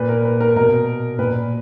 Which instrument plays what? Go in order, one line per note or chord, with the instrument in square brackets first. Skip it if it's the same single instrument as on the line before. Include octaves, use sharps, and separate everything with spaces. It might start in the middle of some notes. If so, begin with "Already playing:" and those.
Already playing: [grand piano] A#2 B4
A#4
B4
A#4
B2 A#4
A#2 B4